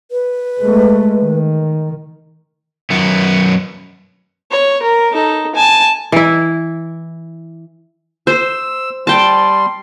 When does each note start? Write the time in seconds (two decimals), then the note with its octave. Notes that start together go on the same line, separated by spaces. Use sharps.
0.11 B4
0.61 G#3 A3
1.22 D#3
2.90 F#2 B3
4.51 C#5
4.82 A#4
5.12 D#4 A4
5.55 G#5 A5
6.12 E3 E4
8.27 C5 E6
9.07 G3 G5 A5 C6